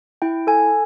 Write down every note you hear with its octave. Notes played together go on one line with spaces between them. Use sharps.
E4 G5
A4 G#5